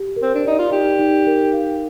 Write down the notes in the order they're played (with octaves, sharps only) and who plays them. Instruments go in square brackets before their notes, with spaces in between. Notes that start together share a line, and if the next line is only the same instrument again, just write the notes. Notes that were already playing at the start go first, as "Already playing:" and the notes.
Already playing: [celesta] G4
A#4
[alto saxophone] C4
D4
[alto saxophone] D#4 [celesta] D5
[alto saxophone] F4
[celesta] D#4 [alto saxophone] G4
[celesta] D#4
A#4
F5